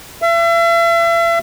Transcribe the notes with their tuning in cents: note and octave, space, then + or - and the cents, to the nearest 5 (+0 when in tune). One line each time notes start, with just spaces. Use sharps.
E5 +40